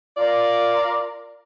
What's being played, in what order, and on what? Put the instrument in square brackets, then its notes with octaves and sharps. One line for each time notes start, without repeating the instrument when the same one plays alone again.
[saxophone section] F4 A#4 D5